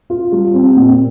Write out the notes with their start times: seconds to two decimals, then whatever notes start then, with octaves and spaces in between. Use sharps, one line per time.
0.10 F4
0.32 G3
0.54 C4
0.76 A#2